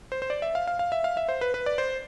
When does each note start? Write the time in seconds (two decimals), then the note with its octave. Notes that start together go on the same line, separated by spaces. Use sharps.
0.12 C5
0.22 C5
0.30 D5
0.42 E5
0.55 F5
0.67 F5
0.79 F5
0.92 E5
1.04 F5
1.17 E5
1.29 C5
1.41 B4
1.54 B4
1.66 D5
1.78 C5